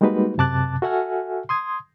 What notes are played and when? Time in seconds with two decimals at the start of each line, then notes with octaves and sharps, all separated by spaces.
0.01 G3 G#3 A#3 D#4 F#4 B4
0.38 F#2 C3 A5 D6 F#6 A6
0.82 F#4 A4 E5 F#5 G#5 F6
1.49 C6 D#6 G#6